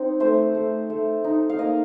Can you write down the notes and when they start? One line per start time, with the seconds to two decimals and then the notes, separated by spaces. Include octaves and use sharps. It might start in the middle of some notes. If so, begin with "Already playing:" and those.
Already playing: C4 D#4
0.20 A3 C5
0.55 A3
0.90 A3
1.24 D#4
1.49 F5
1.59 A#3 D#5